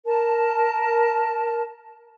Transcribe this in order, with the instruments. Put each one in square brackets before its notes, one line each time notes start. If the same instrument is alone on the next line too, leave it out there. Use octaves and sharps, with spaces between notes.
[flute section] A#4 A5